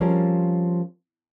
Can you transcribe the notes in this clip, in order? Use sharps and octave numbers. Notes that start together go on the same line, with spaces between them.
F3 G3 C4 C#4 G#4 A#4